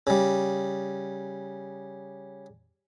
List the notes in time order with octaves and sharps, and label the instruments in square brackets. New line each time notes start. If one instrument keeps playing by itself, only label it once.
[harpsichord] C#3 G3